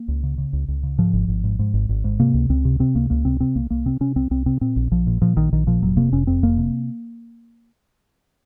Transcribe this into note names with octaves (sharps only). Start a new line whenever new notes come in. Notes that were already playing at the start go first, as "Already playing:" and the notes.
Already playing: A#3
C#2
C#3
C#3
C#2
C#2
C#3
G#2 F3
G#1
G#1
G#2
G#2
G#1
G#1
G#2
C3 A#3
C#2
C#2 C4
C3
C3 C4
C#2 A#3
C#2 A#3
C3 C4
C3 C4
C2 A#3
C2 A#3
C3 C4
C3 C#4
C2 C4
C2 C4
C3 C4
A#2 C4
A#1
A#1 F3
A#2
A#2 F3
A#1 D#3
A#1 D#3
A#2 F3
F1 F#3
C3 A#3
F1 C#4
F2 C4
F1 A#3
C3